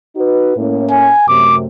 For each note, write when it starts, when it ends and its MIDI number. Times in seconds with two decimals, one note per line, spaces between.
0.16 0.53 63
0.16 0.53 66
0.16 0.53 71
0.57 1.10 45
0.57 1.10 58
0.57 1.10 61
0.91 1.26 80
1.28 1.67 42
1.28 1.67 48
1.28 1.67 57
1.28 1.56 86